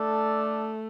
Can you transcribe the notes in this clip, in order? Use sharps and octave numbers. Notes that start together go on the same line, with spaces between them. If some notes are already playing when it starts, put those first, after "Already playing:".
Already playing: A3 D4 A4 D5